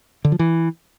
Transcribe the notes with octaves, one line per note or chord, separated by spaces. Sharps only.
D3
F3
E3